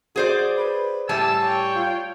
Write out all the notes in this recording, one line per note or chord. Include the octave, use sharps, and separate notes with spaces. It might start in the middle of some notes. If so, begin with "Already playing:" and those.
F#4 G#4 C5 D5
B4
A2 G3 G#5 A5 E6
C#5 G5
F4